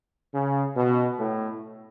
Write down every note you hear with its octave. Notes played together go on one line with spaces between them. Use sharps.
C#3
B2
A2